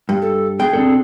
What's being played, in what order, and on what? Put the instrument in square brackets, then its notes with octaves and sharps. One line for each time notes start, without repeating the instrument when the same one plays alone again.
[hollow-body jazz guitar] G2
[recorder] A4
[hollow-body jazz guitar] B2 G5 [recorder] G#4
[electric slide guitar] C4 D4 A4